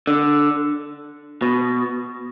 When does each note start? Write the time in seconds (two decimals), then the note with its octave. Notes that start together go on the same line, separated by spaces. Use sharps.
0.07 D3
1.42 B2